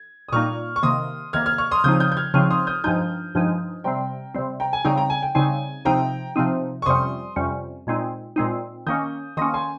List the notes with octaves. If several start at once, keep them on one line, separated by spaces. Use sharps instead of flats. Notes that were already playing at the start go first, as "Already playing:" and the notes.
Already playing: G#6
D#6
A#2 G3 A#3 D#4 C#6 F6
C#6
C3 D#3 A#3 C6 D#6
C3 D#3 A#3 F6 G#6
F6 G#6
C#6 F6
C6 D#6
C#3 F3 C4 D#4 D#6 G6
D#6 G6
G6
F6 G#6
C#3 F3 C4 D#4 C#6 F6
C6 D#6
D#6 G6
G2 F3 G#3 D#4 D#6 G6
G2 F3 G#3 D#4
C3 G3 C4 G5 A#5
C3 G3 C4
G5 A#5
G#5
C#3 G3 C4 D#4 G5 A#5
G5 A#5
G#5
G5
C#3 G3 C4 D#4 G#5
C3 F3 C4 D#4 G5 A#5
C3 F3 C4 D#4
C#6
F2 C3 G3 C#4 C6 D#6
F2 C3 G3 C#4
A#2 G#3 C4 D#4
A#2 G#3 C4 D#4
D#3 A#3 C#4 D#6 G6
D#3 A#3 C#4 C6 D#6
G#5 C6